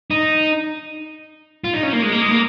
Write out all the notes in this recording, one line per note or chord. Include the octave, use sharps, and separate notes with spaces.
D#4
F4
D#4
C#4
A#3
G#3
A#3
G#3
A#3